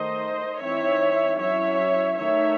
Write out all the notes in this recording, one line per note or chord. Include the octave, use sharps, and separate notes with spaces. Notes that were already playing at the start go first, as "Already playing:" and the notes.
Already playing: D#3 A3 D#4 C5 D#5
E3 C4 D#4 C#5 E5
F#3 C#4 E4 C#5 E5
D#3 A3 D#4 C#5 E5